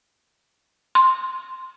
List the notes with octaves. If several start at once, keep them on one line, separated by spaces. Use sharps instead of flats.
C6